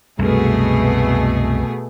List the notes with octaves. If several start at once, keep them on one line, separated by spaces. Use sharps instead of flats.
C2 F#2 B2 A3 G#4